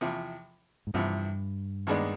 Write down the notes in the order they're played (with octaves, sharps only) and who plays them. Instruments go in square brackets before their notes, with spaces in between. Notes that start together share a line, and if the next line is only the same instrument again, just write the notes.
[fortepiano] E2 C3 F3
[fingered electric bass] G#2
[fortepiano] E2 C3 F3 [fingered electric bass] G2
[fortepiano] D#2 D#3 G#3 B3 D4